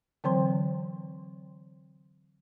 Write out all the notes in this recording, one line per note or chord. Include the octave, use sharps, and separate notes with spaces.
D3 E3 F#3 C4 C5 C6